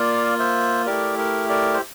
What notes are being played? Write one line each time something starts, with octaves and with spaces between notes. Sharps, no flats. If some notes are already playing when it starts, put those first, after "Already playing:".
Already playing: A#3 F4 D5 F5
C5 E5
A3 E4 G4 A#4 D5
A#4
A#4 D5
C5